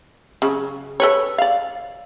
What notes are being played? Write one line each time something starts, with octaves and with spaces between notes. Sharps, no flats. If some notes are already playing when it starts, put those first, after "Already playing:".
C#3 F#3
A4 B4 C#5
D5 F5